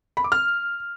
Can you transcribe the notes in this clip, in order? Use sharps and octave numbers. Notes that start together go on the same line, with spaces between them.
B5
D6
F6